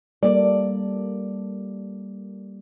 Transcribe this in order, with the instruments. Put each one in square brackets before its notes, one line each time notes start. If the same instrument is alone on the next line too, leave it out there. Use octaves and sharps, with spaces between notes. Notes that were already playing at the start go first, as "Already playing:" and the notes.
[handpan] G3 A#3 A4 [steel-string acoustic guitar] D5